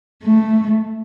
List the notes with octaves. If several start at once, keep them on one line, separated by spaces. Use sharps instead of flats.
A3